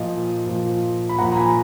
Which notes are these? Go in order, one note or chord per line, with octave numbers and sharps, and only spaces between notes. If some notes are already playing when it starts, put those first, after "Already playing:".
Already playing: A#2 F3 D#5
A#2 F3
B5
A#2 F3 F#5 A#5
A#5
G#5 B5